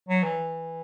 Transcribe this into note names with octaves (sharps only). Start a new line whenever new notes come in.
F#3
E3